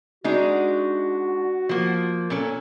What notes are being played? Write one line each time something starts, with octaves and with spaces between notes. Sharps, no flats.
G#3 D4 D#4 F#4
F3 A#3
A#2 C#4 A4